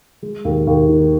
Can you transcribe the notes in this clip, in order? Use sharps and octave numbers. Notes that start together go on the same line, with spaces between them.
G#3
D#2
D#2
D#3